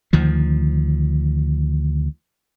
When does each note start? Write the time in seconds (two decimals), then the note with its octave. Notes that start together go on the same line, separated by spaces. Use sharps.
0.13 D2 D#3 F3